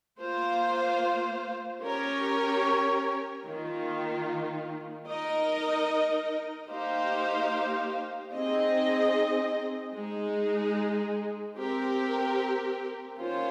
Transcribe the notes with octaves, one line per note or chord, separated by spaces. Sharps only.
A#3 F4 C5 F5
C#4 G4 A#4 C#5
D#3 A#3 F4
D#4 A#4 D#5
A#3 D#4 G4 C5 F5
C4 D#4 G#4 D#5
G#3 D#4 G#4
C4 G4 A#4
D#3 A#3 C#4 F4 C5